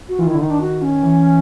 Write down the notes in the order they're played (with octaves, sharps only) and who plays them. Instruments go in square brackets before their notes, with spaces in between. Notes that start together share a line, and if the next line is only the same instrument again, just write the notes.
[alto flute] F#4
[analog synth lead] E3 [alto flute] F4
[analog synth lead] D#3
[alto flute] E4
[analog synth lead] D3
[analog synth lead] D#3 [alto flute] D#4
[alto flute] D4
F#4
C#4
[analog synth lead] E3